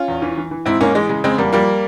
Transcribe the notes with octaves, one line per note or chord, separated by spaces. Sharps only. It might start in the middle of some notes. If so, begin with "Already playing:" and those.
Already playing: C#4 F4
E2
E3
E3
E3
G#2 C4 E4
G#2 A#3 C#4
E3 G#3
C#3 G#3
C#3 G#3 C4
E2 G3 A#3
F3 G3 A#3